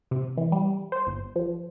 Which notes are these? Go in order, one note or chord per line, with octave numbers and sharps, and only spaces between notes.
C3
E3
G3
C5
G1
F3